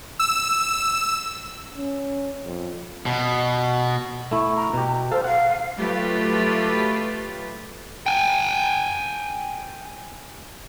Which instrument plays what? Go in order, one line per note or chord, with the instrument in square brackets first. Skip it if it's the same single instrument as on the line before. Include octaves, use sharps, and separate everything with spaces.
[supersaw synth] E6
[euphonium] C#4
F2
[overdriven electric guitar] B2
[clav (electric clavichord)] A3 E4 [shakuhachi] C#6
[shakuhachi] A#5
[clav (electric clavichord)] B2 G4
[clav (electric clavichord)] A4 F5 [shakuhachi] C5
[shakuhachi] F5 [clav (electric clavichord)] F#5
[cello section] F#3 A3 F4 G4 B4
[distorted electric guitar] G5 G#5